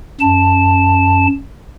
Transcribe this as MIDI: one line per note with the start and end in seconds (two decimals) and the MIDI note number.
0.20 1.26 42
0.20 1.26 81